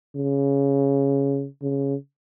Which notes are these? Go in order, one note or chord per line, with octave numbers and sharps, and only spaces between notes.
C#3
C#3